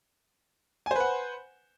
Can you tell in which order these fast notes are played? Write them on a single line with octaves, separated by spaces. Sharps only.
G#5 C5 B4 F#5